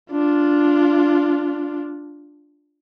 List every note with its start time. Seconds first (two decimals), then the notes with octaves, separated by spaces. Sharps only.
0.12 D4 F4